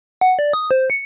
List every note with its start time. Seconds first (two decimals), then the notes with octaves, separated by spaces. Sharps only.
0.21 F#5
0.39 D5
0.53 D#6
0.71 C5
0.90 C#7